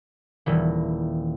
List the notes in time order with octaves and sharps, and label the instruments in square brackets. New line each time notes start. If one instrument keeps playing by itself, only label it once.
[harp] D#1 E3